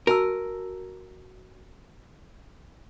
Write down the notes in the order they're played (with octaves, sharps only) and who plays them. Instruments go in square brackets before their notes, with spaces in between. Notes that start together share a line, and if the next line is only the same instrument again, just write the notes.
[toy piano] F#4 A5 E6 [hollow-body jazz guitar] A#4